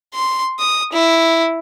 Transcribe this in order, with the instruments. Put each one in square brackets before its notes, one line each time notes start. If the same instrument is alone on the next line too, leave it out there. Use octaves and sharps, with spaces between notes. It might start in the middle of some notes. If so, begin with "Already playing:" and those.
[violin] C6
D#6
E4